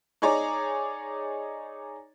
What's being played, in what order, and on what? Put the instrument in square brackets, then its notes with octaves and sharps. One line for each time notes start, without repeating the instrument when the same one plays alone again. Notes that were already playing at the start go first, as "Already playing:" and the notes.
[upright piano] D#4 G#4 C#5 D5 A#5